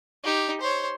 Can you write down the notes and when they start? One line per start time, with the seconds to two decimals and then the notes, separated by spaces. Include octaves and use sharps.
0.24 D#4 G4
0.61 C5 C#5